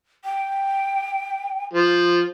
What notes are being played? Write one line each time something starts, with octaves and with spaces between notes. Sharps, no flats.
G5
F3